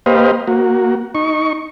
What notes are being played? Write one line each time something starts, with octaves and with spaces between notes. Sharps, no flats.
A#3 G4 B4 C5 D#5 F5
A#3 F#4
D#4 C#6